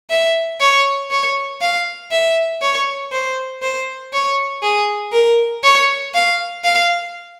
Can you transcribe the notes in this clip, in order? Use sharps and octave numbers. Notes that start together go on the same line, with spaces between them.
E5
C#5
C#5
F5
E5
C#5
C5
C5
C#5
G#4
A#4
C#5
F5
F5